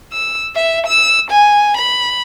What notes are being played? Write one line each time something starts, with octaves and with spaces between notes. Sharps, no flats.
E6
E5
E6
G#5
B5